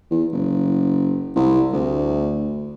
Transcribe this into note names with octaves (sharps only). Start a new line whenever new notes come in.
E2
F#1
C2
D2